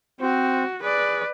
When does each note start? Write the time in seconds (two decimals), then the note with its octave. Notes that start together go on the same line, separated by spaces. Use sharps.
0.21 C4 F#4 C5
0.82 G#4 B4 D5